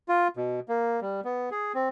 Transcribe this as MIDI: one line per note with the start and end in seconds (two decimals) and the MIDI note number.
0.08 0.28 65
0.37 0.60 47
0.69 1.00 58
1.01 1.21 55
1.24 1.49 59
1.51 1.72 68
1.74 1.89 60